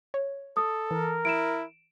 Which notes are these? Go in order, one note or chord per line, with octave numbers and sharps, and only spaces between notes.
C#5
A4 D#6
E3 A#4
E4 D7 E7